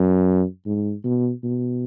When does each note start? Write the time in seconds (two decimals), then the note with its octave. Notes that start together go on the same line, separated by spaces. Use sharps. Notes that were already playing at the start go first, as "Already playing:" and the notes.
Already playing: F#2
0.66 G#2
1.04 B2
1.43 B2